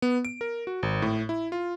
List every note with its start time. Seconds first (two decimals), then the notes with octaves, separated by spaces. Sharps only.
0.02 B3
0.25 D7
0.41 A#4
0.67 F#4
0.83 G#1
1.02 A2
1.29 E4
1.52 F4